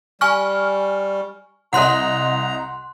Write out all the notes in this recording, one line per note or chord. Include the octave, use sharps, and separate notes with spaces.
G3 G#5 C#6 F6
C2 D#5 F#5 A#5 C6 F#6